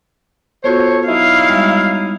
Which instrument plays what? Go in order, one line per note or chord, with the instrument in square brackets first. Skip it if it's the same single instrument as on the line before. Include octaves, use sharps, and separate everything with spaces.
[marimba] B3 F4 F#4 [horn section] A4 C5 C#5
[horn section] F#3 D#4 E4 [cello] F5
[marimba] G3 G#3 E5